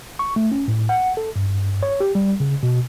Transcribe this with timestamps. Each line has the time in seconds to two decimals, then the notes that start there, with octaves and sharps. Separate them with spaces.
0.19 C#6
0.36 A3
0.52 C#4
0.68 A2
0.89 F#5
1.17 A4
1.36 G2
1.83 C#5
2.00 G4
2.15 G3
2.40 C#3
2.63 B2